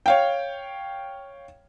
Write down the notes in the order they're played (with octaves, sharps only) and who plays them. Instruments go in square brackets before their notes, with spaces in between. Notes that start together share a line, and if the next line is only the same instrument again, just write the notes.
[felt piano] C#5 F5 G5